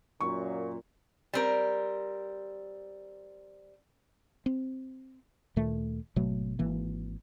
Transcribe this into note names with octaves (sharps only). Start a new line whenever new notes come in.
F#2 A#2 C#6
G3 C4 A#4
C4
D2 A#2 D#3 A3
G#1 B2 F#3 A3
G#1 E3 A#3